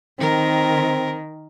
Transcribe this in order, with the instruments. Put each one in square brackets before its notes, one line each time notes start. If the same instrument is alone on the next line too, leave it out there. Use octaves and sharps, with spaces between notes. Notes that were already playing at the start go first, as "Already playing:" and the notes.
[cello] D#3 [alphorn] C4 [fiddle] A#4